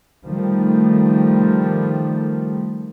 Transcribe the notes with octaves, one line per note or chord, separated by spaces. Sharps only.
D#3 F3 G3 A3